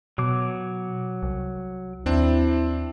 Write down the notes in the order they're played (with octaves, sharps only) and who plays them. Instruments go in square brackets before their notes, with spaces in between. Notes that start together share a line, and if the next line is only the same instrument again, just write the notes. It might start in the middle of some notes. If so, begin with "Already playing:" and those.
[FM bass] B2 [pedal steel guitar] F#3 D6
[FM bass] C2
[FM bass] D#2 [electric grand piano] C4 D4 [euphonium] E4